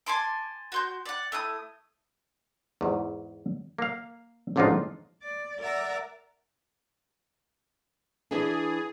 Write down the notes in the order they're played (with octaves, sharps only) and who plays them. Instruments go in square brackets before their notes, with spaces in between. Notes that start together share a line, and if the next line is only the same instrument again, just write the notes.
[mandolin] G#5 A5 C6 D6
F#4 C6 G6
D5 F#5
A3 E4 D#6
[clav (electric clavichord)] E2 G#2
A#3 F5
A1 F2 G#2 D4 D#4 F4
[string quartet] D5
A#4 D5 E5 F#5 A#5
[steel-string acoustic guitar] E3 D4 [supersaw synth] G#4